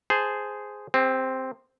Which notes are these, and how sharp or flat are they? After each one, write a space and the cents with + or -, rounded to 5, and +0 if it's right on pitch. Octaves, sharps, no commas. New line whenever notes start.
G#4 +0 C5 -10 A5 +0
C4 +0 G#4 -45